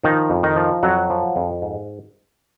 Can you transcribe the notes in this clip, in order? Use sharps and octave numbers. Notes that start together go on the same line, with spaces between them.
D#3 F3 D#4
F2
D#3 D#4
F3
F2 F#3 F#4
F3
F2
G#2